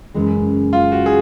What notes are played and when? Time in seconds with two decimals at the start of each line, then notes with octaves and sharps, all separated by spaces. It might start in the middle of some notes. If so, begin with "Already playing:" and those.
0.14 F#2 C#3 E3 G#3
0.73 F4
0.92 F#4
1.06 G#4